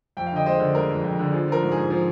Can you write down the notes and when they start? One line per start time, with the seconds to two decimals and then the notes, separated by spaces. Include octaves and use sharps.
0.17 F2 G5
0.26 F5
0.32 D3 D#5 G5
0.46 G#3 C5 D#5
0.60 D3
0.75 G#3 A#4
0.90 F2
1.04 F2
1.19 D3
1.32 F3 G#4
1.48 F3 A#4
1.63 G#2
1.72 G#4
1.77 G#2
1.90 F3